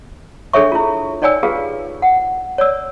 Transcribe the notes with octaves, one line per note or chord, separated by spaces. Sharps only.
D4 G#4 A4 C#5 E5 C#6
E4 F4
D#4 C#5 D5 G5 G#5 E6
F4 G4 G#4 B4 F5
F#5
C#5 D5 E6